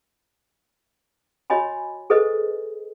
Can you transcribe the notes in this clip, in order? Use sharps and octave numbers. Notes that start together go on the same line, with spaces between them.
F#4 C#5 D#5 G#5 B5
G#4 A4 B4 C5 D#5